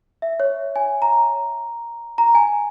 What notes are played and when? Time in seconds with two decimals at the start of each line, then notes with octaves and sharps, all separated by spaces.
0.22 E5
0.40 C#5
0.76 G#5
1.02 A#5
2.18 A#5
2.35 G#5